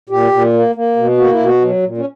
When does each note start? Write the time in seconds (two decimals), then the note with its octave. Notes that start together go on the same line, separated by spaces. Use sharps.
0.09 A#2 G4
0.31 A#2
0.53 A#3
0.75 A#3
0.96 B2
1.18 A#3 F#4
1.32 E4
1.39 B2
1.45 F#4
1.61 F#3
1.83 A#2
1.97 C#4